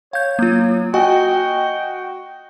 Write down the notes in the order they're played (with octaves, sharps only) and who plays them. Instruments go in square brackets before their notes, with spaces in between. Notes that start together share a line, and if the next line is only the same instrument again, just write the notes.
[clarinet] C#5 [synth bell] F5 G6
[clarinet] F#3 [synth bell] A#3 F4
[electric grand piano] F#4 D#5 [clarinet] G5 [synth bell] G#5